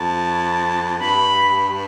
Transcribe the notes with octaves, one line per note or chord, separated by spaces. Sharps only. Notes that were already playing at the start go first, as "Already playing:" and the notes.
Already playing: F2 A5
G2 B5